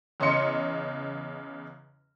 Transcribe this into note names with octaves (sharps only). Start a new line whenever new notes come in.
E2 C#3 D#5 C6 C#7